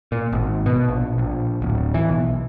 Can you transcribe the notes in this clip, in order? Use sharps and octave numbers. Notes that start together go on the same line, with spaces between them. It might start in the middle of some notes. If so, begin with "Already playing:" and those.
A#2
G#1
B2
A#1
A#1
D1
E3
B1